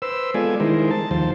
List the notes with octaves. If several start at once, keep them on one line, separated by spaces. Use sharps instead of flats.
B4 C5 E6
G#3 B3 F4 A4 D5 G#5
D#3 G#3 E4 G#4 A#4 C5
A5
D#2 F3 C5 A5